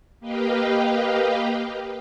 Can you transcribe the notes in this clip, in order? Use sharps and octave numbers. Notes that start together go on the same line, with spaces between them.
A#3 G4 B4 D#5 F5 G5